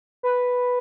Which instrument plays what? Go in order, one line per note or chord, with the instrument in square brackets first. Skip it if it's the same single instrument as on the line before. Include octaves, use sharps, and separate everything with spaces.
[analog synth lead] B4